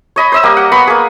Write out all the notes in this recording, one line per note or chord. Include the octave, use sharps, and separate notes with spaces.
C#5 D#5 B5
C5 D#5 E6
G3 A#3 G4
F#5
B3 B5 C#6
A#3 G#4